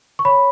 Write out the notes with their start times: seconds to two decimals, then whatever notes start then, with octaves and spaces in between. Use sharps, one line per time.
0.19 C#6
0.25 C#5 B5